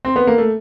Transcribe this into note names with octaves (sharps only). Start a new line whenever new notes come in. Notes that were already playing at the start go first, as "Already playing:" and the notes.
C4
B3
A#3
A3